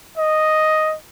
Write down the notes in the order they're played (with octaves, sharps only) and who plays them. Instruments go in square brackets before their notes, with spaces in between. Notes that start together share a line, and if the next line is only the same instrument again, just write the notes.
[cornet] D#5